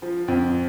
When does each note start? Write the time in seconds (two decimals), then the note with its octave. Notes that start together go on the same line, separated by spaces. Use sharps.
0.02 F3
0.28 F2